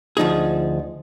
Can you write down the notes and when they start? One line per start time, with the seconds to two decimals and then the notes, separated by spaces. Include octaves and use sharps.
0.17 D2 F3 D#4 G#4